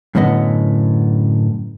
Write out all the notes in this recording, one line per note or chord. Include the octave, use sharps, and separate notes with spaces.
F#2 A2 D3 B3 D#5